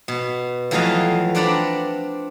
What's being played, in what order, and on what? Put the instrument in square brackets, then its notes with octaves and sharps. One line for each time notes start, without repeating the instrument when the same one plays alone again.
[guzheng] B2
F2 E3 F#3 A3 D#5 F5
C4 D4 B4 D5 F#5 A#5